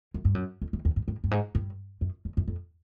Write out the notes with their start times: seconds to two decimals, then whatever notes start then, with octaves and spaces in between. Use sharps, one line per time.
0.14 F#2
0.25 G2
0.35 F#2
0.62 F2
0.73 E2
0.85 E2
0.96 G2
1.08 G#2
1.24 G2
1.31 G#2
1.55 G2
2.01 F#2
2.25 E2
2.37 F#2
2.48 F2